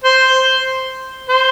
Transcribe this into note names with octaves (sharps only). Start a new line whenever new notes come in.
C5
C5